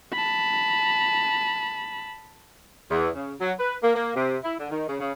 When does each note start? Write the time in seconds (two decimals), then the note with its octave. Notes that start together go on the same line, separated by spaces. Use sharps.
0.13 A5 B5
2.91 E2
3.15 C#3
3.40 F#3
3.59 B4
3.83 A#3
3.95 A#3
4.15 C3
4.44 E4
4.59 D3
4.70 D#3
4.88 C#3
5.00 C#3